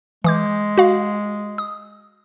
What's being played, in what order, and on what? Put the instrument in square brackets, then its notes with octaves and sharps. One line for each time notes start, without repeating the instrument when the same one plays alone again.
[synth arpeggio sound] E3 D6 G6 [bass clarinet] G#3
[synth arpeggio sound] F#4 F5
D#6